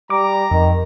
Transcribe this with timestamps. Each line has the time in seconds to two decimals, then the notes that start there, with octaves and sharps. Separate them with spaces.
0.10 G3 A#5 D6
0.51 F2 D#3